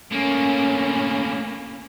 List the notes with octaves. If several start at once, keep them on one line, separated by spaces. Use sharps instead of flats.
A2 A#3 C#4